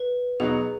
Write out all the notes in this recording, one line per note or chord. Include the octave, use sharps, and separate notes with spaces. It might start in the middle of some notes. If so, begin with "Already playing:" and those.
Already playing: B4
B2 F#3 D#4 G#4